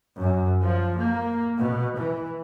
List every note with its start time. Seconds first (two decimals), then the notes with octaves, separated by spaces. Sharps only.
0.18 F#2
0.61 F3
0.96 A#3
1.58 B2
1.98 E3